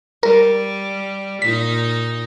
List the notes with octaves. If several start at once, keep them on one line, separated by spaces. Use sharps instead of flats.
G3 A#4
A#2 D#4 B6